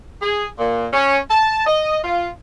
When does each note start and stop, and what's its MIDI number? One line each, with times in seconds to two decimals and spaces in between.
0.22 0.47 68
0.59 0.87 46
0.93 1.19 61
1.30 1.64 81
1.66 1.99 75
2.04 2.29 65